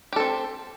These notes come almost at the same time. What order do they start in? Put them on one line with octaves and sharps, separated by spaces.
G4 A4 C4